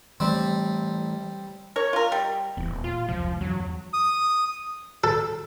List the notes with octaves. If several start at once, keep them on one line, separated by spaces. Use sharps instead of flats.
E3 G3 A3 C4
A#4 C#5
F4 A#4
G3
D#1 E2
A#2
F4
F1 C#2 F#2 F3
E2 G2 F3 F#3
D#6
A4